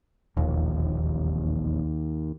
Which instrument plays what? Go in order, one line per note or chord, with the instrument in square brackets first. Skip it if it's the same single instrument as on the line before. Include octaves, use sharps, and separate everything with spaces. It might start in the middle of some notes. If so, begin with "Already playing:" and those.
[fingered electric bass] E1 A#1 [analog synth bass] D#2